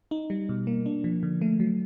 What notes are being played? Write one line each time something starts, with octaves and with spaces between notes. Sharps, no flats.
D#4
G3
B2
A#3
D4
F3
D3
A3
F#3